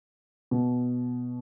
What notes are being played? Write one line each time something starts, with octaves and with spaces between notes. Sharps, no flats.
B2